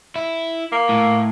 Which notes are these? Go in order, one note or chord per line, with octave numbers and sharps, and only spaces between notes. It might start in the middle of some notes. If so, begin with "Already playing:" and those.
E4
A#3
A2